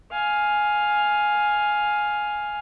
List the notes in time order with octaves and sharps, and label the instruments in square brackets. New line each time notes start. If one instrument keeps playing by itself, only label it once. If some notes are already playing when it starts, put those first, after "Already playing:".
[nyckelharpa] F5 G#5